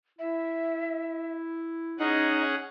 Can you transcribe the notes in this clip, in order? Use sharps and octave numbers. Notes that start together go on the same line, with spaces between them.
E4 E5
C#4 D#4 G#4 F#5